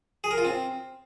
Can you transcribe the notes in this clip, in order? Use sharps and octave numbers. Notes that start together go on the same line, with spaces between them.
G#4
A#4
F4
C4